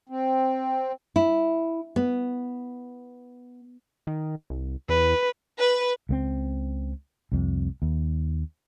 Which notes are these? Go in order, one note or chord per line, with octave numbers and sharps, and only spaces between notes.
C4
E4
B3
D#3
C2
E2 B4
B4
C#2 A3 C4
C2 F2
D#2